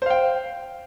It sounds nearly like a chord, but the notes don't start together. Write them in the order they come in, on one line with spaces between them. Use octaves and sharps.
C5 F5 G5